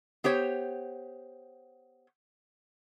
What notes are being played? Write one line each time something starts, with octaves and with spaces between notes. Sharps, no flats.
B3 G4 C5 C#5